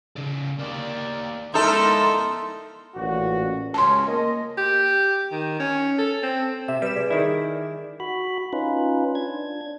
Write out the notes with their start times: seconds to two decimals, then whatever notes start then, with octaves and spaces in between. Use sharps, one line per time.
0.16 C#3 D5
0.59 A#3 G4 D5
1.54 G#3 D#4 E4 A4 A#4 E5 C6
2.94 A1 A#2 F#4
3.74 C#2 C#4 A5 C6
4.06 A#3 A#4 D#5
4.58 G4
5.31 D#3
5.60 C#4
5.99 A4
6.23 C4
6.68 C3 E5
6.82 G3 B4 E7
6.96 G#4 D5
7.11 D#3 E4
8.00 F#4 B5
8.53 C#4 D#4 F4 B4
9.15 D4 G#6